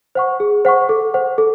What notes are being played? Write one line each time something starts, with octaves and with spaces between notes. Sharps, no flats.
C5 F#5 C#6
G#4
C5 F#5 C#6
A4
C5 F#5
A4